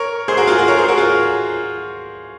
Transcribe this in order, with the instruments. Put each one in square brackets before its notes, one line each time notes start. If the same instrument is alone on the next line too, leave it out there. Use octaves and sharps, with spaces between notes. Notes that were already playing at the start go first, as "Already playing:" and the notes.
Already playing: [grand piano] A#4 C#5
G#4 C5
F#4 A#4
F4 G#4
F#4 A#4
A#4 C#5
G#4 C5
F#4 A#4
F4 G#4